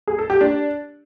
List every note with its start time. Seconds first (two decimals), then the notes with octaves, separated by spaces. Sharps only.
0.07 G#4
0.19 A4
0.30 G4
0.41 D4